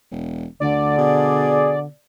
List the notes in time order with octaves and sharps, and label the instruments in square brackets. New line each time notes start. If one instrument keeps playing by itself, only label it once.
[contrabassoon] E1
[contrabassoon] D2 [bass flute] D3 [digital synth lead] D5
[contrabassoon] B2 [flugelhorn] G#4